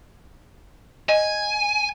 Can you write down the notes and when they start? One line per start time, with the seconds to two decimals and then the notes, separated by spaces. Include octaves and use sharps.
1.09 D#5 G#5